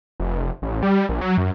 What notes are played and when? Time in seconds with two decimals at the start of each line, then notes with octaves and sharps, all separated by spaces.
0.20 F1
0.62 A1
0.83 G3
1.09 A#1
1.21 F#3
1.38 F#2